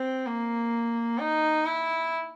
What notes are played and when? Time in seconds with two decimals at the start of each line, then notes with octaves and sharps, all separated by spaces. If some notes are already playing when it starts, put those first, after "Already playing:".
Already playing: C4
0.26 A#3
1.19 D#4
1.66 E4